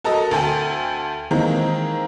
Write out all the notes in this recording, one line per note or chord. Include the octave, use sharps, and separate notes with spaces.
F#4 A4 A#4 D#5 A#5
D2 A4 G5 G#5
D#3 E3 G#3 A#3 C4 A#4